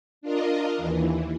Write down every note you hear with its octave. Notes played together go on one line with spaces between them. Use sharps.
D4 F4 A#4 D#5
D#2 E3